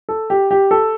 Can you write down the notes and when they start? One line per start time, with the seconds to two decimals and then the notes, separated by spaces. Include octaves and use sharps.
0.09 A4
0.30 G4
0.51 G4
0.71 A4